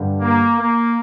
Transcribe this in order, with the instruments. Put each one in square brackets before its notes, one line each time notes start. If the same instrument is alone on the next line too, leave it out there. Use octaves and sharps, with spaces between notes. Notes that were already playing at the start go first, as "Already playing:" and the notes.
Already playing: [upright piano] G2 D3 G3
[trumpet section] A#3
A#3